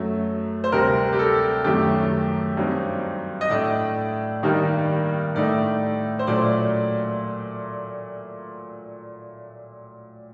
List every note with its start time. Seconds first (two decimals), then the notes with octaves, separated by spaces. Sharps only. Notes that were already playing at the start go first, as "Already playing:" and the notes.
Already playing: F#2 F#3 A3
0.64 C5
0.72 D2 C3 G3 A#4
1.13 G4
1.19 A4
1.64 F#2 D#3 F#3 A3 G4
2.57 G2 F#3 C4 D#4
3.41 D#5
3.50 A2 A3 D4 D5
4.43 G2 D#3 G3 A#3 D#4
5.35 A2 A3 D#4 D5
6.19 C5
6.27 A#2 F#3 A3 D4 D5